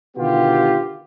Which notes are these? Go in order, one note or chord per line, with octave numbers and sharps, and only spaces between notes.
B2 D3 D#3 B3 F4 G4